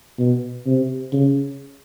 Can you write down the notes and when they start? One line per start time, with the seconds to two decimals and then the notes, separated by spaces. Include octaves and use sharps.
0.19 B2
0.67 C3
1.13 C#3